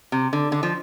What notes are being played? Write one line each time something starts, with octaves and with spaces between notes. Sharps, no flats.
C3
D3
D3
F3